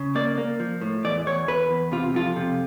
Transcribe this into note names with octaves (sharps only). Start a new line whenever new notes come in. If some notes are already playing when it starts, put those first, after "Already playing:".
Already playing: C#3
A#3 D5
A#3
F3
A2
E2 D5
E2 C#5
E2 B4
E2
C3 F4
F2 F4
C3